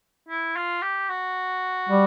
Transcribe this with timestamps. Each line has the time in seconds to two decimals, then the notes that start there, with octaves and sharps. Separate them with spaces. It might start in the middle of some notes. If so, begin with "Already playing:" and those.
0.29 E4
0.56 F4
0.82 G4
1.09 F#4
1.89 G3